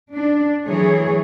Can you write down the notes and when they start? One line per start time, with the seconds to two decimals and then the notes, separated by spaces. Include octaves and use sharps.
0.12 D4
0.67 E3 F#3 A3 G#4 C#5